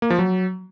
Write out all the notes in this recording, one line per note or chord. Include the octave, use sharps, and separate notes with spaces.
A#3
F3
F#3